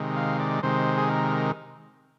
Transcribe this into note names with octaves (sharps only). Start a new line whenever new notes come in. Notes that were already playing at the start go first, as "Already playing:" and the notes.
Already playing: C3 D#3 G#3
F5
D5
C3 D#3 G#3 C5
G#4
A#4